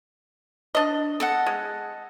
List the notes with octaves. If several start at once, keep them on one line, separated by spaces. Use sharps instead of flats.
D4 D#5
A4 D#5 F#5
G#3